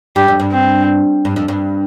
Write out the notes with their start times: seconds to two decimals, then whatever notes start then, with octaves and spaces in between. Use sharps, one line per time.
0.16 G2 G4
0.28 F2
0.40 G2
0.52 C4
1.25 G2
1.36 F2
1.48 G2